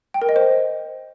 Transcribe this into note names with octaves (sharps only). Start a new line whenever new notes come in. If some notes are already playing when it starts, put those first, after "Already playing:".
G5
A#4
D#5
C5